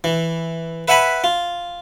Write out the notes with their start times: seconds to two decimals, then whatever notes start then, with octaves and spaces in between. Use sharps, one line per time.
0.04 E3
0.88 B4 E5 F#5 G#5 B5
1.24 F4